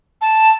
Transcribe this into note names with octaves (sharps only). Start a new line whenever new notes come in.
A5